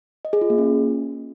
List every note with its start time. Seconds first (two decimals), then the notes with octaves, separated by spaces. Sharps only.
0.25 D#5
0.33 G#4
0.41 F4
0.50 A#3
0.58 C#4